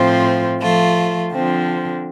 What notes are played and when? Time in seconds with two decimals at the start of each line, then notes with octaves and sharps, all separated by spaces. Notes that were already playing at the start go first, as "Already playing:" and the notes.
Already playing: A2 F3 C4 F4
0.60 F3 A3 F4
1.32 D3 F3 C4